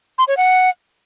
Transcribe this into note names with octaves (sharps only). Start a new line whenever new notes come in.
C6
C#5
F#5